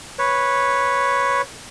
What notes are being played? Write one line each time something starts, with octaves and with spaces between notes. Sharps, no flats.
B4 C#5